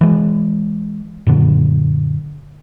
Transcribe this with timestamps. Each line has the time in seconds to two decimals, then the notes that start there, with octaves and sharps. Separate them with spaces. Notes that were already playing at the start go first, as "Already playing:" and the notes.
0.01 E3 G#3
1.27 F#2 A#2 D3